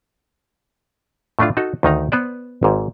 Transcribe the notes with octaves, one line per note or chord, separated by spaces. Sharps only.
A2 A3 D4 F4
D#4 F#4 A4
D2 D#3 D#4 A#5
B3 B4 C5 D5
G#1 G#2